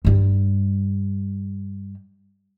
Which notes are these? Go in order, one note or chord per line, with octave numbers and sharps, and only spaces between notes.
G2 G3